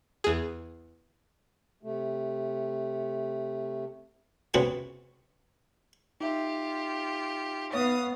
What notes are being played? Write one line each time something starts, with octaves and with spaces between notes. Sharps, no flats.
E2 G#4
C3 A3
C#2 C3 B3 C4 F#4 C#5
D#4 F4 G4 E5
B3 C#5 F5 C#6 D#6